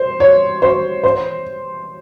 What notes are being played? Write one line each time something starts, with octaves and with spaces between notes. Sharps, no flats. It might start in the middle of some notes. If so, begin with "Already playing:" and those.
Already playing: C5
C#5
C5
C5